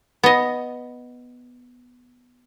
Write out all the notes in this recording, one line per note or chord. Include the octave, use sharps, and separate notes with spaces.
B3 D#5